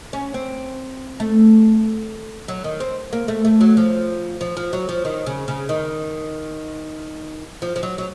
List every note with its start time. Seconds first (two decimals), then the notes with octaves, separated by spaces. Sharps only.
0.13 C#4
0.34 C4
1.20 A3
2.48 F#3
2.64 D#3
2.80 C4
3.13 A#3
3.28 A3
3.45 A3
3.61 F#3
3.77 F3
4.41 F3
4.57 F3
4.73 F#3
4.89 F3
5.05 D#3
5.26 C#3
5.48 C#3
5.69 D#3
7.62 F3
7.76 F3
7.83 F#3
7.98 F#3